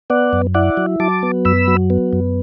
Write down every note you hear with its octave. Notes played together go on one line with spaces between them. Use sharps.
B3 D5 F#5
F#2
E4 D5 F#5
F#3
F#3 A5 D6
B3
F#2 B5 E6
F#3
B3
F#2